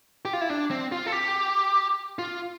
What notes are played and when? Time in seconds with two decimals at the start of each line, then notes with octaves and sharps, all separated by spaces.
0.25 G4
0.33 F4
0.41 E4
0.49 D4
0.71 C4
0.92 F4
1.06 A4
1.12 G4
2.19 F4